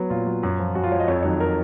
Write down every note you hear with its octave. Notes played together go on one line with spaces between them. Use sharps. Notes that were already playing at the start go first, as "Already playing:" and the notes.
Already playing: F#3 B3
A#2 F4
F#3
F#2
F3
F#2 F#4
F4
F3 C#5
D#5
F2 C#5
D#5
D#3 F#3 C#5
A#4